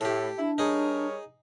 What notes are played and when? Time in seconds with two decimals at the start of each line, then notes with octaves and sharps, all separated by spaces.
0.01 A2 G4 A4
0.39 D4 E4
0.58 G3 D#4 G#4 A#4 C#5